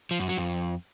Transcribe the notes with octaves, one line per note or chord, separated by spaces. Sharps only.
F3
F#2
F#3
F2